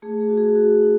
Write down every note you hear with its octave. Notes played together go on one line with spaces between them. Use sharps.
A3 G#4
G#4
F#4
G#4
F#4
D#4